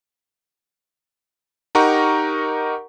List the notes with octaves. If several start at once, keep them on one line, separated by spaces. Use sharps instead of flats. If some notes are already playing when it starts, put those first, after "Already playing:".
D#4 G4 A#4 F#5 A#5 C#6